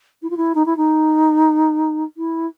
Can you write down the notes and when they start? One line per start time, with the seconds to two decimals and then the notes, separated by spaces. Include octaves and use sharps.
0.22 E4
0.30 F4
0.36 E4
0.54 D#4
0.65 E4
0.77 D#4
2.17 E4